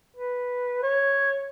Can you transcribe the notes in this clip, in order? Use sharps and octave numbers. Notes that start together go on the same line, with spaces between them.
B4
C#5